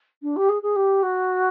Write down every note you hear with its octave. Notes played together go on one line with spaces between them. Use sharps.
D4
G4
G#4
G#4
G4
F#4